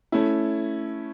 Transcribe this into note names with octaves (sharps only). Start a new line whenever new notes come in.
A3 C#4 E4